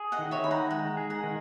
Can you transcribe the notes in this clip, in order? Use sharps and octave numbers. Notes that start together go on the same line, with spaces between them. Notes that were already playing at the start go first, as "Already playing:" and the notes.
Already playing: G#4
D#5 F#5
D#3
C#5 E5
D#4 B5
F#5 A#5
G#3 F#5 A#5
G#4
F#5 A#5
D#3